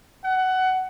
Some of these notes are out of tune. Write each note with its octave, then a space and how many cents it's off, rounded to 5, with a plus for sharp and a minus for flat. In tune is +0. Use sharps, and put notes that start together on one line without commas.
F#5 +15